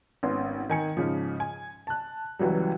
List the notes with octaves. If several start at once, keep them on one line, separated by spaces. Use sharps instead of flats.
G#1 B3 C#4 C6
D#3 G#5 C#7
G#2 C#3 F3
G#5
A5 F#6
C#2 E3 F#3 G3